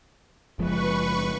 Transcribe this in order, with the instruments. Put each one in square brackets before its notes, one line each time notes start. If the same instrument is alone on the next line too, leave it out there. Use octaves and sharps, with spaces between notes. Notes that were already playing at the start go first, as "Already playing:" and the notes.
[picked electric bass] F#1 F3 G#3 [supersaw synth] B4 C#6